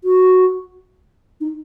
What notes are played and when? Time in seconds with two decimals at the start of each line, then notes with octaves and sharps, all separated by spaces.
0.04 F#4
1.41 D#4